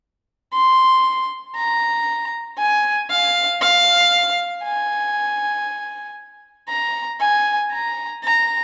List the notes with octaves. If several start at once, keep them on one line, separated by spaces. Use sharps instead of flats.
C6
A#5
G#5
F5
F5
G#5
A#5
G#5
A#5
A#5